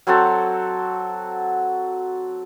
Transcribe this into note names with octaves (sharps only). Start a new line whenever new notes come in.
F#3 C4 F#4 A4